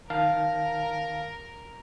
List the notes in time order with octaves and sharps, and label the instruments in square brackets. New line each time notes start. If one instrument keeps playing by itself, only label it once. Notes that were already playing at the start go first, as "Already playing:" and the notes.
[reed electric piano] D#3 F5 A5 [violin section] A#4